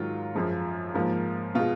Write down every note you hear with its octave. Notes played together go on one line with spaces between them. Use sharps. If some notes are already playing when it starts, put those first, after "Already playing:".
Already playing: G#2 D#3 F#3 F4
F#2 F3 G#3
G#2 F3 A#3
B2 G#3 F4